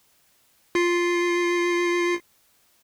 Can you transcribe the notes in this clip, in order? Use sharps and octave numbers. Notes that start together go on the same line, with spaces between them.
F4 C7